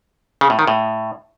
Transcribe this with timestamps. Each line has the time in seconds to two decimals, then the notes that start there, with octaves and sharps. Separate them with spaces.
0.41 C#3
0.50 A2
0.59 D#3
0.67 A2